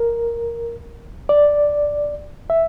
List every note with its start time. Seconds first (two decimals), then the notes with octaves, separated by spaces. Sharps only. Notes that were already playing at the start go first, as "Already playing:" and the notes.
Already playing: A#4
1.29 D5
2.50 E5